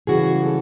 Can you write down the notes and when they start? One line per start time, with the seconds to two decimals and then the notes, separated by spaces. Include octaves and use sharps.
0.07 F#2 C#3 E3 G3 F#4 G#4
0.46 A4